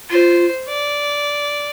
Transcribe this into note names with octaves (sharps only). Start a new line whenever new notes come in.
F4 C5
D5